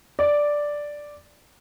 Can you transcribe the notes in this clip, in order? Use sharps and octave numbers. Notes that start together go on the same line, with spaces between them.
D5